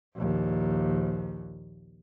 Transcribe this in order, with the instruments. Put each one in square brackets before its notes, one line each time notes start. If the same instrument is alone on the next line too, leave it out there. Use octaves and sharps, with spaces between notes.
[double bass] A#1 D#2